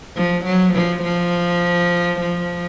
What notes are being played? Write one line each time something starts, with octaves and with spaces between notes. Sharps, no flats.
F3
F#3
F3
F3
F3